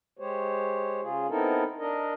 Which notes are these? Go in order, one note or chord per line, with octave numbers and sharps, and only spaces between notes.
G#3 G4 C5 C#5
C#3 F4 G#4
B3 C4 D#4 E4 A4 A#4
D4 A#4 D#5